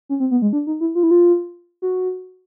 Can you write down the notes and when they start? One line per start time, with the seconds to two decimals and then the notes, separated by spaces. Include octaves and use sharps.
0.09 C#4
0.20 C4
0.31 B3
0.42 G#3
0.53 D4
0.67 D#4
0.81 E4
0.95 F4
1.03 E4
1.11 F4
1.82 F#4